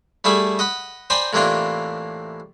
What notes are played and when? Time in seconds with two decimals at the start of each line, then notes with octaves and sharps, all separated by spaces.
0.24 G3 A3 E4 G#4 B5
0.59 D#5 F#5 B5
1.10 C5 D5 G5 G#5 A#5 B5
1.33 A2 C3 E3 A#3 D4 F4